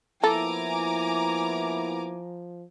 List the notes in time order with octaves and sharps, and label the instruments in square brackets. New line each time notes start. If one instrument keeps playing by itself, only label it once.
[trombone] F3 [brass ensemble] A#3 B3 E4 [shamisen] A4 [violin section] G#5 A#5 D6